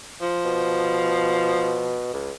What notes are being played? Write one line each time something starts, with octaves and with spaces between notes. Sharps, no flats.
F3
B2
C#2